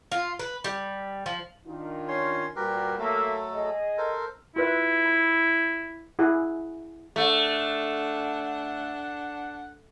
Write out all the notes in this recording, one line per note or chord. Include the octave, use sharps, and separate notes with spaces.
F4
B4
G3
F3
D#3 D4 F4
C#4 C#5 C6
A#2 G3 F#4 G4 A#4 B4
F#3 A3 A#3 A4 E5
G#4 D#5
A4 A#4 C5
E4 F4 B4 E5
B5
E4 G#4 F#5
A3 D4 F#5